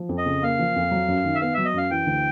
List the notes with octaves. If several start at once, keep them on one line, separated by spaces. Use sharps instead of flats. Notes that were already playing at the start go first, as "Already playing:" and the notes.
Already playing: F3
F2
D#5
C#3
A#3 F5
F3
F2
F#3
F#2
D#3
E5
B3 F5
F#3 E5
D#5
F#2 F5
E3 G5
D2